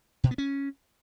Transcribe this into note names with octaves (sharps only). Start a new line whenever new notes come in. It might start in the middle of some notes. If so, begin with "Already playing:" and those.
B2
B3
C#4